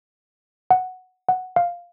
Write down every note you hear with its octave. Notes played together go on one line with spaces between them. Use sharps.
F#5
F#5
F5